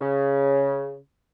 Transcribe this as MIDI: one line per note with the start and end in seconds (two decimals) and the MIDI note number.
0.01 0.96 49